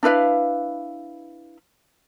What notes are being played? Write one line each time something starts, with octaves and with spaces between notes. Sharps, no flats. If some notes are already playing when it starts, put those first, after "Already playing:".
D4 E4 B4 F5